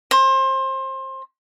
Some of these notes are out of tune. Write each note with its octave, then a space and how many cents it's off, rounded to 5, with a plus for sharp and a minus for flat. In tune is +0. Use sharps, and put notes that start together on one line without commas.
C5 +25